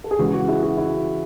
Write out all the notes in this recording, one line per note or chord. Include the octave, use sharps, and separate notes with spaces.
A4
G#4
C#3 E3 G#3 F#4
F#4
E4 G#4
F#4
E4